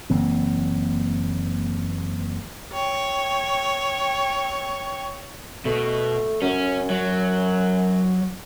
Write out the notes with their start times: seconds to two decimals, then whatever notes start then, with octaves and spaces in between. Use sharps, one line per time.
0.10 F#1 E3 A#3 C4
2.73 C#5 G5
5.65 B2 A3
6.42 F#2 C#4
6.90 F#3